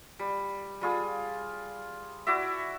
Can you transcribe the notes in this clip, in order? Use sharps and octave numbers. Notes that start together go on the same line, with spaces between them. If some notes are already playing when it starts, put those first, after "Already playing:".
G3
G3 F4 G#4
E4 F#4 D5 E5